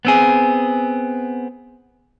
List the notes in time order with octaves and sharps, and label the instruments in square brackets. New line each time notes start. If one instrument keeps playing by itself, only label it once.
[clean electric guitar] B3 C4 G#4